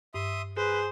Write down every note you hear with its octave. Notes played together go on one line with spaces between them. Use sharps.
G2 E5 C6 D#6
G#4 B4 C5